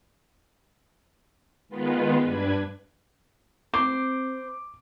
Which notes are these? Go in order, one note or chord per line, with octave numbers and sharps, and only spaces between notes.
D#3 G#3 B3 F4 B4
G2 D4 B4 G#6
C4 C5 D6